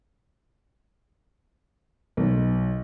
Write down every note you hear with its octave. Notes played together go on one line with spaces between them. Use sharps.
B1